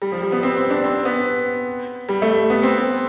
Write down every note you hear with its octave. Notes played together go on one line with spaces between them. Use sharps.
G3
F3
G3
B3
C4
C4
D4
C4
B3
G3
A3
B3
C4
B3